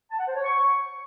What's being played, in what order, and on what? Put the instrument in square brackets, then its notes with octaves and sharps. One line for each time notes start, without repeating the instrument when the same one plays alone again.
[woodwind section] A5
F#5
C5
C#5
C#6